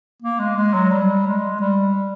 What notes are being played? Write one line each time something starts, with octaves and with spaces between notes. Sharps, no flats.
A#3
G#3
G#3
F#3
G3
G#3
G3